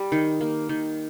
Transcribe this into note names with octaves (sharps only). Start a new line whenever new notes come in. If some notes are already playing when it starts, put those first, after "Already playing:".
Already playing: G3
D#3
A#3
D#3